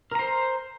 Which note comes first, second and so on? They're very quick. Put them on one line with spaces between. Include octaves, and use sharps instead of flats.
A#4 A#5 C5